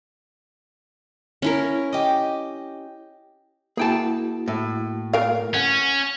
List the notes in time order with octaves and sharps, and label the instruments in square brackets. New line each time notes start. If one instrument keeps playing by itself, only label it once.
[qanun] C#4 E4 A#4
[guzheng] G4 D#5
[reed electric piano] A#3 E4 F#4 [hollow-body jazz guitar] G#4 G5 A5
[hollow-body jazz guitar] A2
[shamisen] A3 A#4 F5
[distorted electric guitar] C#4 [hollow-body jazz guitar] F#5